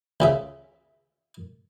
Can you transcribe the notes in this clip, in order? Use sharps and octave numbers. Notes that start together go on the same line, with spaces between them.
C#2 C#3 E5